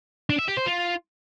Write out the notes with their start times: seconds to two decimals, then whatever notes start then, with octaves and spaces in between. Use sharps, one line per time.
0.30 D4
0.39 E5
0.48 G4
0.57 C5
0.66 F4